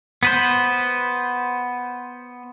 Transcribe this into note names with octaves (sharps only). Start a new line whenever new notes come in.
B3 B4 C5